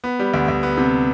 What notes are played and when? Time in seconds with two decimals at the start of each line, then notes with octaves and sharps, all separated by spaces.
0.04 B3
0.19 G3
0.34 D2
0.48 D2
0.63 B3
0.78 C3